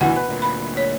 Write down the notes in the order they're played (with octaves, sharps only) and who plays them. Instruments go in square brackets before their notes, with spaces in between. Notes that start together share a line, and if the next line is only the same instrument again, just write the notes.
[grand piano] D2 E3 [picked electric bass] B2 [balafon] F#5
[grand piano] B4
[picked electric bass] D2 A#2
[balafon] B5
C#5